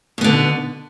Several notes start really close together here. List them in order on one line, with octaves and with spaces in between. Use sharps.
B2 B3 D3